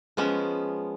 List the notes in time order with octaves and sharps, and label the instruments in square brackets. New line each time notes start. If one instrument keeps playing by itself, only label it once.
[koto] F3 G#3 B3 C#4